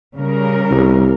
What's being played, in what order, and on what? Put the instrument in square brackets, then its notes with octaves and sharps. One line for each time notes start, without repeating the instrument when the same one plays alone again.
[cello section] C#3 G3 A#4
[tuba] C2